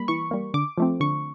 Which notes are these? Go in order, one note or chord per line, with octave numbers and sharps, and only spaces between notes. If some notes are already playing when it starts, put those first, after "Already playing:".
Already playing: G3 A#3 B5
E3 C#6
G3 A#3
D3 D6
F3 A3 C4
D3 C#6